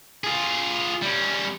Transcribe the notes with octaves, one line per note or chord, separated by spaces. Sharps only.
F4 G#4
G3 C#4